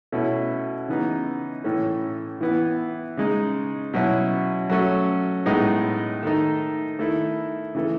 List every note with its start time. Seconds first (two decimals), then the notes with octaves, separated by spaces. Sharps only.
0.12 B2 A3 C#4 E4
0.88 C#3 E3 B3 D#4
1.64 A2 E3 A3 C#4
2.41 E3 B3 E4
3.17 C#3 G#3 D#4
3.94 B2 F#3 C#4 E4
4.70 F#3 A3 C#4
5.46 A2 G#3 B3 D#4
6.23 D#3 A3 D#4
6.99 D#3 A3 E4
7.75 C#3 E3 A3